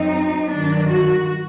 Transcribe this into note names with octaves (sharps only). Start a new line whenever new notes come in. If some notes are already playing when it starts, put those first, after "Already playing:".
Already playing: F#2 F#3 C4 D#4
G2 D#3 F#3 D4
F#4